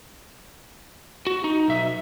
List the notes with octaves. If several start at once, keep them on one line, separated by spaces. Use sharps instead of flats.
F#4
D#4
B1 E5